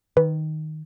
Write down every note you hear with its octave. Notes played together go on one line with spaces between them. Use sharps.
D#3 B4